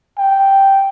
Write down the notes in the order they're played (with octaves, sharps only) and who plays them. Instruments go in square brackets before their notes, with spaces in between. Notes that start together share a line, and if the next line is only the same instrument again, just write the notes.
[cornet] G5